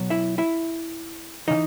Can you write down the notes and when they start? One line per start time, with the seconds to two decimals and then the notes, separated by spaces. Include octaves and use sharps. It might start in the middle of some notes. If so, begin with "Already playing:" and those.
Already playing: B2 F#3
0.10 E4 E5
0.38 E4 E5
1.48 C#3 E3 D#4 D#5